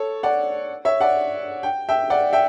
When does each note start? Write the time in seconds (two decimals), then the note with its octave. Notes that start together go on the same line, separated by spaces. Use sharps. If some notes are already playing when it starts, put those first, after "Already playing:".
Already playing: A4 C#5
0.23 D5 F#5
0.85 C#5 E5
1.00 D5 F#5
1.63 G5
1.89 E5 G5
2.10 D5 F#5
2.33 E5 G5